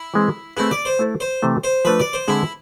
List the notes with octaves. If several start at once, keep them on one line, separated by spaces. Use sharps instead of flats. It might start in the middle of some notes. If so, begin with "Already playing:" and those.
Already playing: E4
E3 G#3 C4
A3 C4 E4 G#4 B4
D5
C5
A3 E4 A4
C5
C3 E3 A3
C5
F3 A3 D4 A4 B4
D5
C5
D3 G#3 C4 E4 G#4